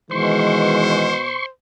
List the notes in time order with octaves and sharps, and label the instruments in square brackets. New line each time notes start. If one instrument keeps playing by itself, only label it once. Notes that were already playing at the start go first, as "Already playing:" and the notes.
[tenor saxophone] B2 [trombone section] D#3 E3 G#3 [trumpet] C5 [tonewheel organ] C6 C#6